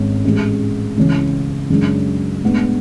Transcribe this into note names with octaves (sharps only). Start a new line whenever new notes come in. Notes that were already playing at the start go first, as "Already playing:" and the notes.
Already playing: G#1 G#2 G#3 C#4
A1 A2 G#3
C#2 C#3 E3 G#3
F#2 C#3 G#3 D4
A2 G#3 B3 D4